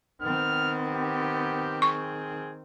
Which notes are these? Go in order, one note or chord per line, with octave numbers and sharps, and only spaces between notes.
D#3 B3 C4 F6
G4
G#4 C#6